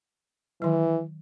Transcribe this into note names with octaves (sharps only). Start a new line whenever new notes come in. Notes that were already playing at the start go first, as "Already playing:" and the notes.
D#3 E3 F#3